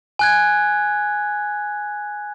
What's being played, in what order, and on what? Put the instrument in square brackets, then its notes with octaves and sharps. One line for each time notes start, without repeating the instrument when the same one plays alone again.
[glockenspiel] G#5 F#6 G#6